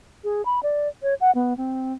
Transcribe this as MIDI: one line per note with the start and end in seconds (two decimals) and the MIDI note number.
0.24 0.44 68
0.45 0.60 83
0.63 0.88 74
1.03 1.14 73
1.21 1.31 78
1.35 1.56 59
1.57 1.93 60